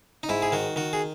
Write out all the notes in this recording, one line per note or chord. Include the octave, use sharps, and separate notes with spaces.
D#4
G#2 E4
G#4
D#3 F#4
D#3 F#4
G#4